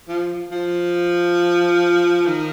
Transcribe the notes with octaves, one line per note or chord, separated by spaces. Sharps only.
F3
F3
D#3